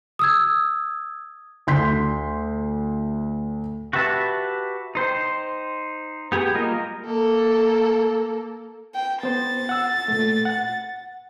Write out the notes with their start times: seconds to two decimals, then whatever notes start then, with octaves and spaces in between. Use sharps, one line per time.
0.19 D#6 E6 G#6
1.67 D2 C6 G6 B6
3.93 F#4 G4 B4 E5 A5
4.95 D#4 C5 G5
6.32 B3 G4 G#4
6.54 G3 A#3 F4 A#4 D#5
7.05 A#3 A4
8.95 G5
9.23 B3 C5 A6
9.69 F#5 E6
10.08 A#2 A3
10.45 F#5